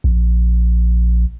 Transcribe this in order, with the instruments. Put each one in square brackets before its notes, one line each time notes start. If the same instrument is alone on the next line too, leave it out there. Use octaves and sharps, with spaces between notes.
[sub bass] A#1